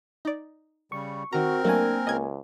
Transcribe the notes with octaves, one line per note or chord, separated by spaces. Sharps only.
D#4 D5
C#3 G3 C#6
D#3 C4 F#4 A#4 A#5
F#3 A3 A#3 D4 G#5
C#2 D#5 G#6